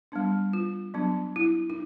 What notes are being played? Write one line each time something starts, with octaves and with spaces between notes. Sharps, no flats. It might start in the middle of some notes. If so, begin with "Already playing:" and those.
G3 B3 D4
F4
F#3 B3 D4
E4
D#4